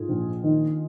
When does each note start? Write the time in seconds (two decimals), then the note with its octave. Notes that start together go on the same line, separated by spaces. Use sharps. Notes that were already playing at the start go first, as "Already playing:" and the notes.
Already playing: G#2 F4 G#4
0.09 A#1
0.43 D#3